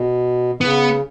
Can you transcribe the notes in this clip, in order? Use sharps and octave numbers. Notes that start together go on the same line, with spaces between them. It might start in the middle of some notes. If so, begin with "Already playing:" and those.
Already playing: B2
C#3 B3